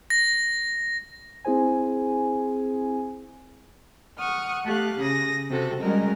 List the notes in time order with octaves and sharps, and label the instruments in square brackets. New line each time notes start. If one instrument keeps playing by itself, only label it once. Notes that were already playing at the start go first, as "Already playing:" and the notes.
[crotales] A#6
[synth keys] C4 E4 G#4 C5 G#5
[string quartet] F#5 C#6 D#6 F6
A3 G4 F5 F#6
C#3 D#6 A#6
C3 F#4 A4
G3 G#3 C#4 F#4 A#4 D#5